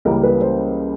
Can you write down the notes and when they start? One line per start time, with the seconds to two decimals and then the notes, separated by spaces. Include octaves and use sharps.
0.05 C#2 C#3 E3 G3 A#3 A#4
0.23 B4
0.42 C5